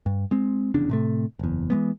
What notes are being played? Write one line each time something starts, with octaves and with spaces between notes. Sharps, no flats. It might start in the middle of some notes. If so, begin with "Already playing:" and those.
G2
G#3 C4
F1 E2 C#3 D4
A2 C3 A3
F#1 E2
E3 F3 G#3 B3